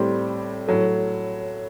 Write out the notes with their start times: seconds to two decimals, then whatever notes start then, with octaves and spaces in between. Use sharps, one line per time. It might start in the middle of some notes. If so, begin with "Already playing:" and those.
Already playing: A2 G3 C4 G4
0.67 A2 F#3 A3